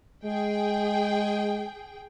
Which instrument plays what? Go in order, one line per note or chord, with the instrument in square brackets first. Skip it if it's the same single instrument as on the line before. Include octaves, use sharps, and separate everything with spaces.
[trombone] G#3 [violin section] G#4 G5